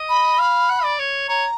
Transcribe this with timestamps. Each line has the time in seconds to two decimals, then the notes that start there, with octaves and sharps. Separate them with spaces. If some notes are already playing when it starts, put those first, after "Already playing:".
Already playing: D#5
0.09 B5
0.39 F5
0.69 F#5
0.84 D5
0.99 C#5
1.29 C#5 A#5